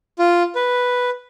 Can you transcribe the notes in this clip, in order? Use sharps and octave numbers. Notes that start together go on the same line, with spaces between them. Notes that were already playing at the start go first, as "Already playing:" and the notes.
F4
B4